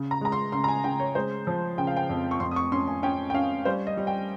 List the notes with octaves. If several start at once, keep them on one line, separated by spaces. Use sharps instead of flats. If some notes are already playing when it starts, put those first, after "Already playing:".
Already playing: C#3
A#5
G#3 A#5
C6
C#3 C6
A#5
G#5
C#3 G5
C#5
G#3 C5
F3
C#3 G5
F5
G5
F2
C#6
F2 C6
D#6
C#6
C#4 C6
G#5
C#4 G5
G5
C#4 F5
G3 C5
D#5
G3
G5